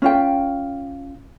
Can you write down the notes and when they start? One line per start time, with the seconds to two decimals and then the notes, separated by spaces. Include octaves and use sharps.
0.02 C#4 F4 G5